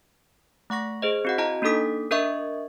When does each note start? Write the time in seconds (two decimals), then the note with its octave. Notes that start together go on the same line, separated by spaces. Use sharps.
0.70 A3 F#5 C#6 A#6
1.02 G#4 C5 D#5
1.25 C4 F#4 F#5
1.38 E4 D#5 A5 A#5
1.62 A#3 D4 D#4 A4 D#6 B6
2.11 D4 A#4 D#5 E5 C#6